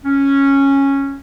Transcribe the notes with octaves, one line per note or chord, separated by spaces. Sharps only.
C#4